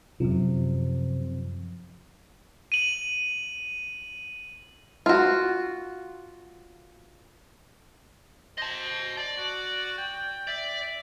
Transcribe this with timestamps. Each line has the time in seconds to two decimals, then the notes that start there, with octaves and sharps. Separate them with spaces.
0.20 F#2 C3 F3
2.72 D#7 F#7
5.06 F4 F#4
8.58 C5 D#5 A5
9.17 D5
9.38 F#4
9.98 G5
10.47 D5 E5